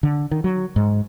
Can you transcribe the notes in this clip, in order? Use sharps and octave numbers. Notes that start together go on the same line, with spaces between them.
D3
D#3
F#3
G#2